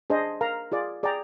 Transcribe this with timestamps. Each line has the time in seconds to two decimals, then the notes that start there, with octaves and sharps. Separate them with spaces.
0.10 D4 G#4 C5 D#5
0.41 A#4 F5 A#5
0.72 F4 G#4 D5
1.03 G#4 D5 G5 A#5